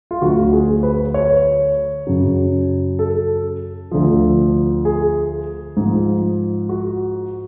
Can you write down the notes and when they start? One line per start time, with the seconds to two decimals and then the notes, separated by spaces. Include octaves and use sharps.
0.11 F4
0.21 D2 D3 F#3 F#4
0.53 G#4
0.83 B4
1.14 C#5
2.07 F#2 C#3 F#3
2.99 A4
3.91 D2 D3 F3
4.85 G#4
5.77 G#2 F3
6.69 F#4